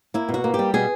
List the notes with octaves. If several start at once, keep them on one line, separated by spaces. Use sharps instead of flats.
A#3 E4
B2
F#4
A#3
G4
G3
B2 G#4